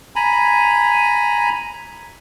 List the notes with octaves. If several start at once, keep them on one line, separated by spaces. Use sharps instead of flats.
G#5 A#5 B5